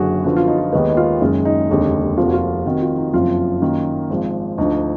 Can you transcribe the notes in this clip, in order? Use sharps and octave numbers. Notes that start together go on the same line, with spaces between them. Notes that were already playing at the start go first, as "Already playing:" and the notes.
Already playing: F#1 F#2 D3 F#4 G#4
F#2 D3 F3 B3 F#4
F4
D#4
F4
D#2 D#3 G#3 B3 D#4
D#4
F4
F#1 F#2 D#3 G#3 D#4
D#4
F1 D#2 D3 G#3
F1 F2 F3 A#3 F4
F#4
F4
F1 F2 D#3 F#4
F4
D#4
F#1 F2 F3 F4
F#2 D#3 F#3 A#3
G#1 G#2 F3
D2 D3 F3 D#4